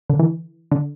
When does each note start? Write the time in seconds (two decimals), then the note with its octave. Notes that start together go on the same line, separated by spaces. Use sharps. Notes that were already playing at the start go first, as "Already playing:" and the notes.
0.10 D3
0.19 E3
0.72 D3